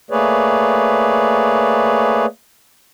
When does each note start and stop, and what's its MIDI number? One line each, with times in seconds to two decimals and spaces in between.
0.11 2.26 57
0.11 2.26 58
0.11 2.26 68
0.11 2.26 71
0.11 2.26 73
0.11 2.26 74